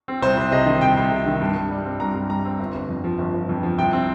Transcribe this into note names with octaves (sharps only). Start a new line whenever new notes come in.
C4
C2 C5
C2
C3 D#5
D#3
C2 G5
C2
C3
D#3
G2
G2
G3
C4
G2 A#5
G2
G3 A#5
C4
G1
G1
F2
F3
G1
G1
F2
F3
C2 G5
C4